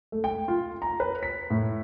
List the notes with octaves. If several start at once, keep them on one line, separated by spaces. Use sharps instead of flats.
A3
G5
F4
A#5
B4
B6
A2